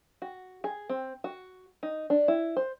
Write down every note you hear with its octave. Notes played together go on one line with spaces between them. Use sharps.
F#4
G#4
C4
F#4
D#4
D4
E4
C5